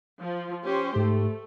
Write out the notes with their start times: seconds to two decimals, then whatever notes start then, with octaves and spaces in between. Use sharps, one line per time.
0.21 F3
0.64 C#4 G4 C5
0.96 G#2 A3 G4